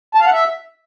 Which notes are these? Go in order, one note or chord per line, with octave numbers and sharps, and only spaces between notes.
A5
F5
F#5
E5